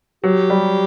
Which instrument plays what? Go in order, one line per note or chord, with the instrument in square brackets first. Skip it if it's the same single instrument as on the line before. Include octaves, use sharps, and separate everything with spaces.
[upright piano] F#3 [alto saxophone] G4
[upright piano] G3